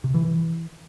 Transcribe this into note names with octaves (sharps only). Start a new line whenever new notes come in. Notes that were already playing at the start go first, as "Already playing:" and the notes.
C3
E3
E3